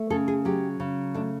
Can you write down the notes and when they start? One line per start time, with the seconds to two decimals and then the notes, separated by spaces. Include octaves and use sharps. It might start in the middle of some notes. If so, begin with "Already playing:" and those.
Already playing: A3
0.10 C#3 A4
0.28 G#4
0.45 F#3 G4
0.80 C#3
1.14 A3 D4